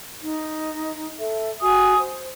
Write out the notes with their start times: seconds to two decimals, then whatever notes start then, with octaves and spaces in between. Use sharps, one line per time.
0.23 D#4
1.19 A4 E5
1.61 F#4 G#5 D#6
1.99 C5